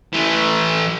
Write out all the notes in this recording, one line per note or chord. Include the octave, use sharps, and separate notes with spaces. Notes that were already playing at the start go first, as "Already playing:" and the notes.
E3 A3